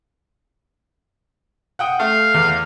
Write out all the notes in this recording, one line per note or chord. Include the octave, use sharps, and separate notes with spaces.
F#5 G5 D#6
A3 F5
E2